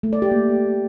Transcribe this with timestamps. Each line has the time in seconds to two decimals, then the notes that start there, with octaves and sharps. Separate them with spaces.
0.03 A3
0.13 D5
0.22 G4
0.31 A#3